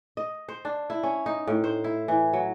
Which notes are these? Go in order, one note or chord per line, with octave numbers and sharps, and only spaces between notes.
D#5
C5
D4
E4
C#4
D#4
A2
C5
E4
E3
F#3